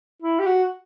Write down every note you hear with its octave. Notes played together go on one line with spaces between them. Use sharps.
E4
G4
F#4